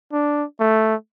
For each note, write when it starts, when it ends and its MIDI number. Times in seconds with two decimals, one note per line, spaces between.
0.13 0.44 62
0.60 0.95 57